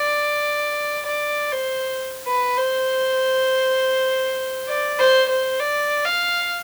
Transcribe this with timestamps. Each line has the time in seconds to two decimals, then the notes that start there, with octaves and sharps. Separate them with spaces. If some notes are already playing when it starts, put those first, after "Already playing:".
Already playing: D5
1.06 D5
1.52 C5
2.27 B4
2.57 C5
4.69 D5
4.99 C5
5.29 C5
5.60 D5
6.05 F5